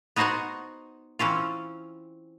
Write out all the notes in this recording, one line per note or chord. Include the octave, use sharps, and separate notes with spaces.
B3 D#4 F#4 C5 F#5 G#5
E3 C4 C#4 F4